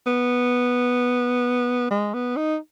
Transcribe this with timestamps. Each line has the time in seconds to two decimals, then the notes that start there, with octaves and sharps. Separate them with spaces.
0.06 B3
1.91 G#3
2.14 B3
2.36 D#4